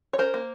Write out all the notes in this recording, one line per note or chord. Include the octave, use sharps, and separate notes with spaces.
C#5
C#4 A#4 C5
A#3